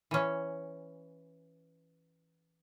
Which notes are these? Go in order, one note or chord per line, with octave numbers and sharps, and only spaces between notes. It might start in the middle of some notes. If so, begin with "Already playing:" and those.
E3 C#4